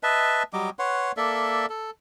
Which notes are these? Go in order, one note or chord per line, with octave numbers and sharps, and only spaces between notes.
B4 D#5 E5 A5
F#3 G3 D#5 D6
B4 C#5 F#5 C6
A#3 A4 D5 E5
A4